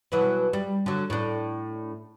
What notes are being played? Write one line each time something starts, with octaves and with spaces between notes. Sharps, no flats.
B2 E3 F#3
G3
D3 F#3
A2 D4